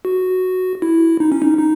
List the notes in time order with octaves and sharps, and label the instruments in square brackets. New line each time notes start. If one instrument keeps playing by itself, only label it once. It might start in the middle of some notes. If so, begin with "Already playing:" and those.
[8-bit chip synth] F#4
E4
D#4
C#4
D#4
D#4